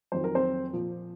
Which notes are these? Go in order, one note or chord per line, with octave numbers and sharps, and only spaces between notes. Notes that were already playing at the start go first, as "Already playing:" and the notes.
F2 D#3 F#3 C5
A#4
C4 C5
A#2 F3